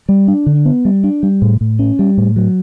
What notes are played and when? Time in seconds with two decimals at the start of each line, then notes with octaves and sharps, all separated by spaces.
0.09 G3
0.28 D4
0.46 D3
0.65 B3
0.85 G3
1.04 D4
1.23 G3
1.42 A2
1.61 A2
1.79 C#4
1.99 G3
2.18 A2
2.36 F#3